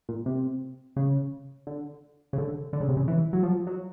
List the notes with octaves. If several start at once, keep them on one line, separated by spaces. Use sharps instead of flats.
A#2
C3
C#3
D3
C#3
D3
D3
C#3
C3
C#3
E3
F#3
F3
F#3